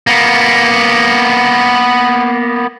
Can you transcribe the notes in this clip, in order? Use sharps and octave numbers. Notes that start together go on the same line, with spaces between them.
A#3 B3